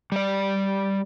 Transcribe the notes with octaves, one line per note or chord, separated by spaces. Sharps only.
G3 D5